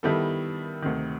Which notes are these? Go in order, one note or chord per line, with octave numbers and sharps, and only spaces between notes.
D#3 G3 B3 E4 A4
D2 C3 D#3